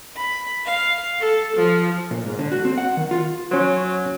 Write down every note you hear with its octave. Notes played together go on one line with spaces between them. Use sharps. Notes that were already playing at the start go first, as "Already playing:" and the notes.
B5
F5
A4
F3
A#2
G#2
D3
F#4
C4
F#5
D#3
F4
F#3 C#4 C5